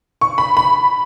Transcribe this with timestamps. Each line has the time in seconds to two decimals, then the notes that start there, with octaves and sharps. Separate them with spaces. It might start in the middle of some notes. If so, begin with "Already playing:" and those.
0.21 C#6
0.38 B5
0.57 B5